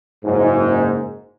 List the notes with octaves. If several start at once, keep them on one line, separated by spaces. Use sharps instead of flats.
F#1 G#2